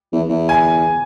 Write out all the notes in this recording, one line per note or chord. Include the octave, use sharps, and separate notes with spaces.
E2
E2
G#5